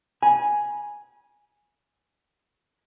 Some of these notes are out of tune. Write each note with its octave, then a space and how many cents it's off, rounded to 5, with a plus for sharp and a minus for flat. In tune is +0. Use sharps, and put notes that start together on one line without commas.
G#5 +0 B5 -40